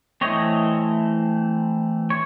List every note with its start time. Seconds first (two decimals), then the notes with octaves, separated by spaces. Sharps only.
0.21 E3 A3 C4 C#5 D#5
2.10 C#5